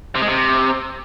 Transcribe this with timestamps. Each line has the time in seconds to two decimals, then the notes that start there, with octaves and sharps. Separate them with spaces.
0.16 C3
0.22 G#3
0.28 C3